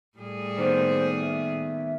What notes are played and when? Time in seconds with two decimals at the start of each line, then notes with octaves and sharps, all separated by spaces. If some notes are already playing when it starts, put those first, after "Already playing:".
0.18 A2 G3 G#4
0.58 D#3 A#3 B3 C5
1.19 E5